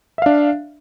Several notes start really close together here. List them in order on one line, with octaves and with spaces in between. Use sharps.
E5 F5 D4